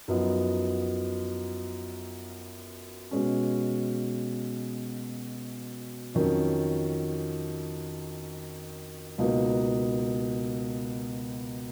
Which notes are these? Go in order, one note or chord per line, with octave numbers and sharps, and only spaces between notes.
F#2 F3 B3 D#4
B2 G#3 C#4
F2 D#3 F#3 C#4
C#2 B2 A#3 D#4